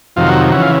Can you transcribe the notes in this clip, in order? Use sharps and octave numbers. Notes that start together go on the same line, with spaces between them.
F2 C3 D#3 F#3 F4
F#4
C#3 E3 F#4
F4